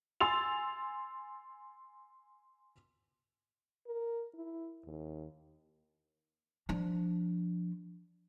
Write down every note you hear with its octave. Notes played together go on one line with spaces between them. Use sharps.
G#5 C6 E6 A6 F7
A#4
E4
D#2
F3 D4